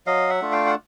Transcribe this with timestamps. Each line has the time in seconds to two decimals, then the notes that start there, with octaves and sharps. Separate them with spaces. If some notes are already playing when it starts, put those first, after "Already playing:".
0.07 F#3 D#5 F5
0.30 E5 F#5
0.41 A3 D4 F4
0.52 F5 G5
0.66 F#5